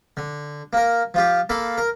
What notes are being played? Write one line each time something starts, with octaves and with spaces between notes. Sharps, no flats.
D3
A#3 A#4
F3 F4 G4
A#3 A4 F5 B5
A#4